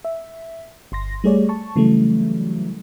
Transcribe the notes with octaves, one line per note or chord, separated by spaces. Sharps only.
E5
G1 C6 A#6
G3 A3 G#4 C#5 D5
A5 C#6
C#3 E3 F#3 G3 A3